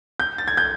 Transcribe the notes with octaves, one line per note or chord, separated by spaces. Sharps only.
G6
A6
G#6
G6